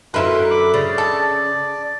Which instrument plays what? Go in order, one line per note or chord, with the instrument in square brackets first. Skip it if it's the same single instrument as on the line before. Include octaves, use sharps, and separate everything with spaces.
[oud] F#2 D3 F4 [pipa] E4 B4 [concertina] A#4 C6 F#6
[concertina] B5 D6
[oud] C#3 [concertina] D5
[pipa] A4